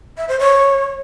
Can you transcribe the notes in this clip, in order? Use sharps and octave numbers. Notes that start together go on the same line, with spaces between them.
E5
C5
C#5